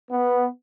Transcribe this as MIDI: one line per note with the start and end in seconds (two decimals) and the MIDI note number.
0.10 0.47 59